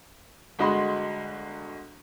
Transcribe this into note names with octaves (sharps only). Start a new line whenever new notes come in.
G1 G#3 F#4 D#5 B5 C6